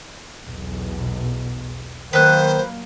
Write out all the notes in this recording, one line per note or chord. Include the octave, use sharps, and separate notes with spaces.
B1 E2 B2
D#3 F#3 A#3 B4 C5 F#6